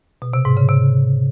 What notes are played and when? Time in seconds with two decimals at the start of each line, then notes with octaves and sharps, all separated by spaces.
0.22 B2
0.33 C3
0.45 G#2
0.57 C#3
0.68 C3